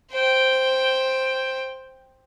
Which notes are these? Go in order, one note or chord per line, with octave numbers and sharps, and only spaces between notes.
C5 G5